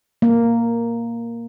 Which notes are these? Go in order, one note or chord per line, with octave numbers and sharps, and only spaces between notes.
A#3